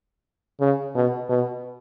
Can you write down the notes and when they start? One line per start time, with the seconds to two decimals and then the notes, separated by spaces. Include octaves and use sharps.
0.60 C#3
0.95 B2
1.29 B2